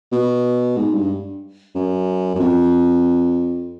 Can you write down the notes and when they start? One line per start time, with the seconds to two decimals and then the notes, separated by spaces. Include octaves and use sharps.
0.12 B2
0.77 G#2
0.94 G2
1.75 F#2
2.35 F#2
2.40 F2